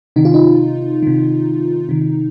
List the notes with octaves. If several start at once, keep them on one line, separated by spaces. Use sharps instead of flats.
C3 D#3 D#4
F4
D#4
C3 D#3
C3 D#3